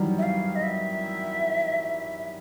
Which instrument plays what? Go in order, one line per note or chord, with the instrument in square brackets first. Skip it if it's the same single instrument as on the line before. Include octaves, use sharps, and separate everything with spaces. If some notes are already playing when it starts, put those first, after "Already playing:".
Already playing: [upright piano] D#3 E3 F#3 G3
[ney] E5
F5
D#5
E5